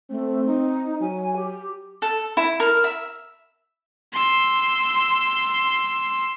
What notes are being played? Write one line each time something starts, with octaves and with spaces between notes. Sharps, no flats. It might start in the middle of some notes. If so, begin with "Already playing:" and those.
A3 C4
D#4
F#3 G#5
G4
A4
E4
A#4
E5
C6 E6